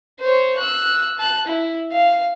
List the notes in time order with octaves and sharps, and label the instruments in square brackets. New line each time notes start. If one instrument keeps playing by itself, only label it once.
[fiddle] C5 C#5
E6 F#6
A5 F#6
E4
F5